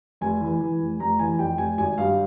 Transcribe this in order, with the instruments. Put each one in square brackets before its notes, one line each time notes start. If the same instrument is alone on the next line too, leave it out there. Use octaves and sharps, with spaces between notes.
[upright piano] F1 G#5
E3
E3
F1
F1 A#5
E3 G#5
F2 G5
F1 G#5
G#1 G#5
G2 F5